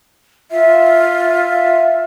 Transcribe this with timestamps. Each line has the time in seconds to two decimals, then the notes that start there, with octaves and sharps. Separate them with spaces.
0.51 F4 E5
1.21 E5